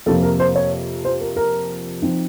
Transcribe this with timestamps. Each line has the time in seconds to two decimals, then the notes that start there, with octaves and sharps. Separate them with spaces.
0.06 F2 C3 F3 A#3 A4
0.23 A#4
0.40 C5
0.55 C#5
1.05 C5
1.21 A#4
1.36 A#4
2.02 F3 C4 D#4